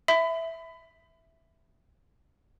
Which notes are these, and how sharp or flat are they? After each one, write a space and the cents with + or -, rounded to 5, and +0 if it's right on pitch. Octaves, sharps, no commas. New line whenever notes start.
E5 +0 B5 +30